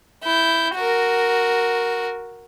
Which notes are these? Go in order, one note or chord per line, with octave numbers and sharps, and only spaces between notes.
E4 G6
F#4 A#4